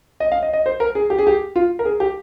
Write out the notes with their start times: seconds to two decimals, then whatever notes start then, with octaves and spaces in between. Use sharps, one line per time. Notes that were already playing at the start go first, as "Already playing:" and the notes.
0.20 D#5
0.32 F5
0.43 D#5
0.53 D#5
0.66 C5
0.80 A#4
0.95 G#4
1.10 G4
1.18 G#4
1.27 G4
1.56 F4
1.79 A#4
1.85 G#4
2.00 G4